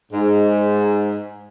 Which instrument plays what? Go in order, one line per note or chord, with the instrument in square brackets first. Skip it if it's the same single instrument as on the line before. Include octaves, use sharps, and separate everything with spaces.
[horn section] G#2